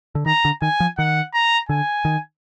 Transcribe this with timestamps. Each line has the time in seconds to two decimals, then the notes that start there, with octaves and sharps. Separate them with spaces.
0.15 D3
0.26 D#3 A#5
0.45 D3
0.62 D#3 G#5
0.80 F3
0.98 D#3 F#5
1.33 A#5
1.69 D3 G#5
2.05 D#3